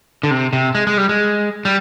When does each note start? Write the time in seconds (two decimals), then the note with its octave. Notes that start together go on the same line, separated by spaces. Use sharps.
0.23 D3
0.31 C3
0.53 C3
0.75 G#3
0.87 G#3
0.97 G3
1.09 G#3
1.65 G3